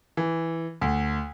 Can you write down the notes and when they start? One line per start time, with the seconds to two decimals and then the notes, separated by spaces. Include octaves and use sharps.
0.17 E3
0.81 D2